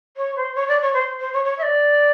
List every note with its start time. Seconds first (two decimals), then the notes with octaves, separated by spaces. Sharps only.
0.17 C#5
0.36 C5
0.55 C#5
0.68 D5
0.81 C#5
0.94 C5
1.20 C5
1.33 C#5
1.45 C#5
1.58 E5
1.63 D5